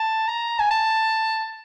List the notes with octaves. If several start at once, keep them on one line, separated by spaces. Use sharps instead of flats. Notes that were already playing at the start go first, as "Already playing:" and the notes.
Already playing: A5
A#5
G#5
A5